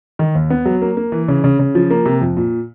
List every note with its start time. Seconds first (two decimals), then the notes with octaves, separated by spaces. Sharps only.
0.19 D#3
0.35 D#2
0.50 B3
0.65 F#3
0.82 A#3
0.97 A#3
1.12 E3
1.28 C#3
1.44 C#3
1.59 C#3
1.75 F3
1.91 A#3
2.06 C3
2.21 F2
2.37 A#2